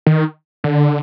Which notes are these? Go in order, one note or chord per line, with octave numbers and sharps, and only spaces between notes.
D#3
D3